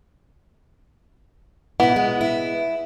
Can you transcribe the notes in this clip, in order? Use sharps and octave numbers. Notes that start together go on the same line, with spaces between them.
B2 B3 E4
G#3
E4